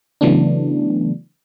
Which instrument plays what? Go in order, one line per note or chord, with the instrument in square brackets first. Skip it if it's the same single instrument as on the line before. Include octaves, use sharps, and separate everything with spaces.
[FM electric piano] C#3 E3 F#3 A3 B3 D4